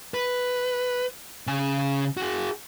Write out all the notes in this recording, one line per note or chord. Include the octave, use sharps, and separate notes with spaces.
B4
C#3 G#5
F#4 G#4